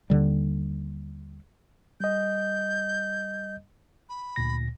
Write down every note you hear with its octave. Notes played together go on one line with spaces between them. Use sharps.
D#2 D3 G3
G3 D#5 G6
B5
D2 A#2 A#6